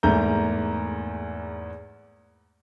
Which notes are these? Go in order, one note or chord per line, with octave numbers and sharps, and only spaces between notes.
E2 G#2 A3 A#3 A#5 G6